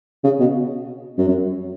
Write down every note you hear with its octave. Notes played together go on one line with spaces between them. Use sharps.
C#3
B2
F#2
F#2